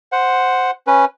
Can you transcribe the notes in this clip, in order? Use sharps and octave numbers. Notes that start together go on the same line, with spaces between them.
C5 F#5
C#4 B4